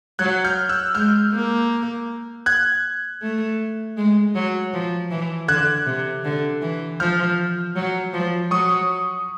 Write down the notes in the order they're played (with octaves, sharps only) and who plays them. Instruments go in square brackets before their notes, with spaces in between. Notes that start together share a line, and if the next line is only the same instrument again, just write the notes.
[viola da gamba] F#3 [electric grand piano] F#6 G#6
[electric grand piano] F6 G6
E6 F#6
[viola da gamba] G#3 [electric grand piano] F6 G6
[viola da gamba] A#3
[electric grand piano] F#6 G#6
[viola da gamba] A3
G#3
F#3
F3
E3
[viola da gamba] D3 [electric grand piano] F#6 G#6
[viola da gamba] C3
D3
E3
[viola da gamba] F3 [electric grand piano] F6 G6
[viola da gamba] F#3
F3
[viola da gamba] F#3 [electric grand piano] C#6 D#6